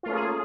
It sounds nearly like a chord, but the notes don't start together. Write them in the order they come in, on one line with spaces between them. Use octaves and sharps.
F4 A3 C#4 A#3 G#4